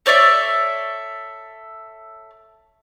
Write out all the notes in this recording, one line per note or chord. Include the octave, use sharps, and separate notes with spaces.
A4 C#5 D5 E5